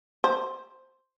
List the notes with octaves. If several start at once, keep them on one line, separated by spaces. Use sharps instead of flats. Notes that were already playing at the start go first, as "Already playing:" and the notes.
C5